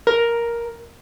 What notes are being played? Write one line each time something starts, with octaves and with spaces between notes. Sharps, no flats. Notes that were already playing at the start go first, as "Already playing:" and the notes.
A#4